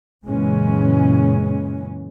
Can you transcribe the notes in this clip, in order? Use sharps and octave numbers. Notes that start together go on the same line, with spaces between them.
F#2 A#2 C#3 E3 G#3 C#4